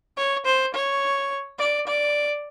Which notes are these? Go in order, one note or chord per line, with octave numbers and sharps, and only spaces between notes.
C#5
C5
C#5
D5
D5